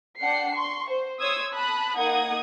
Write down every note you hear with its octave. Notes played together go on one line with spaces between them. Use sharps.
D4 F#5 G5 C7 C#7
C6 C#6
C5
C#5 C6 D#6 E6 G#6
A5 B5 D#6 F#6
A#3 D#4 F#5 D#6 G#6